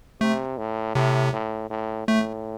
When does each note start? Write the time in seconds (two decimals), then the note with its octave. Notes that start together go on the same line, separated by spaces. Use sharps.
0.21 C3 A3
0.58 A2
0.95 A2 C3
1.33 A2
1.70 A2
2.08 A2 A3